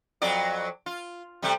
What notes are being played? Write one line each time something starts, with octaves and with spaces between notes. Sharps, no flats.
F2 F#3 D5
F4
C3 G3 A3